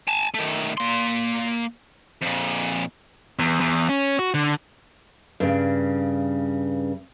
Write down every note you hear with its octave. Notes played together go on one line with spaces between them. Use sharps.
G#5 A5
D#3 A3
A#3 C6
F2 A#2
E2
E2
C#4
F#4
D3
G2 C#3